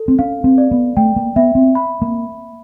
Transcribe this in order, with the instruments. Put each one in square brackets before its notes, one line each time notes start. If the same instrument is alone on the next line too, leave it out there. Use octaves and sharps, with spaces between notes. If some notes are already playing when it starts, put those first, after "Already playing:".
Already playing: [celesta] A4
[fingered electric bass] C4
[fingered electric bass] C#4 [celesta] F5
[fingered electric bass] C4
[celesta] D5
[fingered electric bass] B3
[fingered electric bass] A3 [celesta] G5
[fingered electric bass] A#3
[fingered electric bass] B3 [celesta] E5
[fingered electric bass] C4
[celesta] B5
[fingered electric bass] A#3